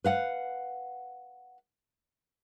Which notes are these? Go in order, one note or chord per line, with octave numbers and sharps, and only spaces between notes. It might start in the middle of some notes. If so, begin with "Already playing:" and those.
B4 F5 F#5